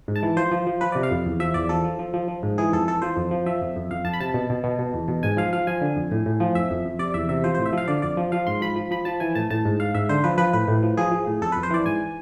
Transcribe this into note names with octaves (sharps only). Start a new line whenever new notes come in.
G#2
A5
E3
F3 C5
F3
F3
F3 B4
C3 D5
F5
F2
E2
F3 E5
E2 D5
F3 A4
F3
F3
F3
F3
G#2
E3 G#4
F2 A4
E3 A4
F3 C5
F2
F3
F3 E5
F2
F2
F2 F5
F2 A5
B5
C3 A5
B2
B2
B2
B2
E2
B2
G#2 G#5
F3 F5
F3 F5
F3 G#5
D3
F2
A2
A2
F3
F2 E5
F2
F2
C3 D5
E2 E5
C3 E5
F3 C5
A2 C5
E5
F3 F5
D3 D5
F2 D5
F3
F3 F5
G#2 C6
F3 B5
F3
F3 B5
F3 A5
E3 G#5
A2 A5
A2 A5
G#2
G#2 F5
G#2 E5
D3 C5
F3 B4
F3 B4
A2 B4
A2
F3
F3 G#4
F3
A2
F2 A4
F2 B4
C5
E3 D5
G#2 G#5